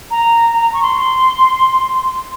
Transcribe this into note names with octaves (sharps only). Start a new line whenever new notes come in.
A#5
C#6
C6